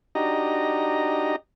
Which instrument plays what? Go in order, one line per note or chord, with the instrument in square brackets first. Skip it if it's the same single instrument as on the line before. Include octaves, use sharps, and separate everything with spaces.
[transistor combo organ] D4 D#4 F#4 G4 D#5 A#5